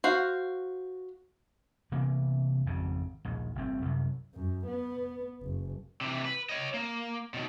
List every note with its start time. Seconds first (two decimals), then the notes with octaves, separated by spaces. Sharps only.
0.04 F#4 C5 F5
1.92 C3 E3 A#3 B3
2.66 G#1 F2 C#3
3.25 A#1 D#2
3.55 G1 A2 C4
3.82 C2 F#2
4.34 F#2
4.67 B3
5.42 F#1
6.01 C3 E3
6.25 B4
6.49 C#5 D#5
6.74 A#3
7.34 B2 D#3